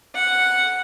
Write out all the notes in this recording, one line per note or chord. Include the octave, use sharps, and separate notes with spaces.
F#5